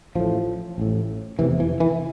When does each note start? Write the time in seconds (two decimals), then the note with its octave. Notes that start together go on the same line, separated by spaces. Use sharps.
0.15 A1 A2 F3
0.78 A1 A2
1.39 F1 E2 C3 E3
1.60 E3
1.80 E3